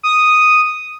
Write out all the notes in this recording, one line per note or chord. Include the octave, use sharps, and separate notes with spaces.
D#6